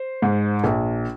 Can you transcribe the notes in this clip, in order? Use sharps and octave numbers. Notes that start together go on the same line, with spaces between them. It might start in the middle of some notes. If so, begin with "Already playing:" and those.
Already playing: C5
G#2
A#1